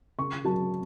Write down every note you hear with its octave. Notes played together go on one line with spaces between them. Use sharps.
C#3 C#6
F#3 A5